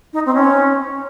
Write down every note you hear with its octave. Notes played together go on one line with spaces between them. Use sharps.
D#4
C4
C#4